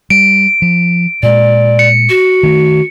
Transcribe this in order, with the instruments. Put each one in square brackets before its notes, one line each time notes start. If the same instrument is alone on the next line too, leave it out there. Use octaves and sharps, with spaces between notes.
[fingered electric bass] G3 [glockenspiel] D7
[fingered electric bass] F3
[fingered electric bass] A#2 G#3 [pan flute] D5
[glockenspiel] C#7
[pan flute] F#4
[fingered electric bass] D#3 A3